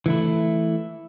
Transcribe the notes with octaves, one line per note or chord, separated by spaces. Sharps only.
E3 A3 E4